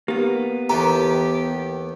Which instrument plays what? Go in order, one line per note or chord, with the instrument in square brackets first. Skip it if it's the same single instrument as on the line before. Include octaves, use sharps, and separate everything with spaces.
[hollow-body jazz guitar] A#3 B3 [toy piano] G4
[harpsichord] D#2 E3 A4 [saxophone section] G4 [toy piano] A#5